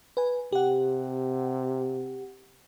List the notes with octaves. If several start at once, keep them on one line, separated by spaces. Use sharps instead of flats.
B4 G#5
C3 G4 F#5